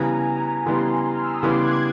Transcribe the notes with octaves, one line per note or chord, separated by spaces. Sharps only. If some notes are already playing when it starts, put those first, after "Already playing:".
Already playing: C#3 E3 G3 B3 G#5 A#5
G#5 A#5
C#3 E3 G3 B3 A#5 C6
F6
E6
D#6
C#3 E3 G3 B3 C6 D6
F#6 G#6